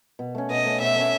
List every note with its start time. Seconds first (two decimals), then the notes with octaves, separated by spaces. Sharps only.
0.19 B2
0.35 A3 C#4
0.50 B2 D#5
0.66 A3 C#4
0.81 B2 E5
0.96 A3 C#4